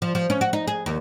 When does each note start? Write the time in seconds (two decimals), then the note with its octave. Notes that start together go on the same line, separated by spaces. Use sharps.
0.02 F3
0.15 F3
0.30 C#4
0.41 F#4
0.53 D#4
0.67 G#4
0.86 D#2